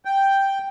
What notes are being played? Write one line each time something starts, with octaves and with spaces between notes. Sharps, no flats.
G5